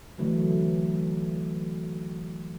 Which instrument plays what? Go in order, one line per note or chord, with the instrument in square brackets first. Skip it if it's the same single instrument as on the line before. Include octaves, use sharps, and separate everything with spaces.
[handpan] D3 E3 F#3 A3